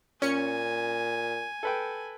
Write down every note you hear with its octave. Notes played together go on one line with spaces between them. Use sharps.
A#2 C#4 G#5 C#7
A4 B4 G5